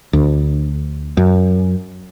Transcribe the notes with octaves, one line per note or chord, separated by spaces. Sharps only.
D2
F#2